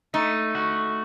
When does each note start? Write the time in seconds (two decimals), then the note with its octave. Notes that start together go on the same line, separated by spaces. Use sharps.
0.14 A3 D#4
0.55 F#4